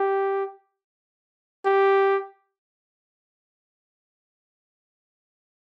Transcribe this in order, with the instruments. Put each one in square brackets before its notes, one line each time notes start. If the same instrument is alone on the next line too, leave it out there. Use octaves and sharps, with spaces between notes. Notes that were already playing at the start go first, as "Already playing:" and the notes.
Already playing: [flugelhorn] G4
G4